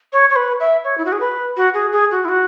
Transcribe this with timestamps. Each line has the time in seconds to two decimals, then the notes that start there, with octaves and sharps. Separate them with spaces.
0.13 C#5
0.30 C#5
0.36 B4
0.60 E5
0.84 C#5
0.97 E4
1.05 F#4
1.12 G#4
1.20 B4
1.57 F#4
1.74 G#4
1.92 G#4
2.11 F#4
2.25 E4
2.29 F#4